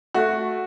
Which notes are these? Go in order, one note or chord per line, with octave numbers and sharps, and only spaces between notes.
A3 F#4